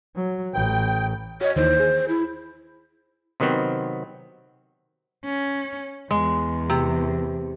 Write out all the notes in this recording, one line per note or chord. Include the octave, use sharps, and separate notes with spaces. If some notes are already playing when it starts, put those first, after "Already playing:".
F#3
A1 G5
F#4 C#5 D#5
D#2 D#3 E3 C5
G#4
E4
C3 D#3 F#3 B3 C4
C#4
E2 G#3
C3